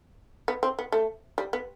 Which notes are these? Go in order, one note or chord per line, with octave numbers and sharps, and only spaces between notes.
B3
C4
B3
A3
G3
B3